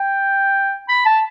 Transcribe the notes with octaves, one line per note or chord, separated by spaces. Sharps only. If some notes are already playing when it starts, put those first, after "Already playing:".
Already playing: G5
B5
A5